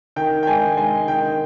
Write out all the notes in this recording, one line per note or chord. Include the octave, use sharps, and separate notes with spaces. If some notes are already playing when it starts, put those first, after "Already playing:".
D#3 G5
G5
G#3 G#5
G#3 G#5
D#3 G5